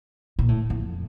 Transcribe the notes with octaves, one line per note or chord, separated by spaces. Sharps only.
A#2
A2
F2